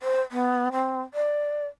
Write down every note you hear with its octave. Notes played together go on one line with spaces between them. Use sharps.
C5
B3
C4
D5